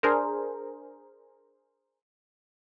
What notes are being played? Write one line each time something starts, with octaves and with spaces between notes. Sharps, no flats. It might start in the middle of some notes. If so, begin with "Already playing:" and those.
D4 G#4 A#4 C5